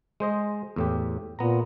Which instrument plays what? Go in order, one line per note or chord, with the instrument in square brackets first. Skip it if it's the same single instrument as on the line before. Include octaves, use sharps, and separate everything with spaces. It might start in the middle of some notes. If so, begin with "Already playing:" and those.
[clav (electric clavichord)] G#3 C5 D#5
E2 A2 G4
[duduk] A#2 [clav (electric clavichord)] B3 A#5